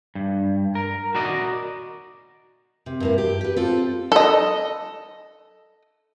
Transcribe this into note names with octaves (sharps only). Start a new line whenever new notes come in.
G2
A#4
F#4 A#4 D5 D#5
C3
G2 A#3 E4
G4
G4 B4
C4 F4 A4
A4 D#5